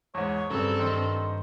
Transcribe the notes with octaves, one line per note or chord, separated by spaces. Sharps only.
E2 G#2 C#5
G2 C#3 F#3 C4 A4
D#3 D#4 C5